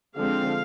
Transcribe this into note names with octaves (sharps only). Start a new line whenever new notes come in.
D3 F3 G#3 C4 F5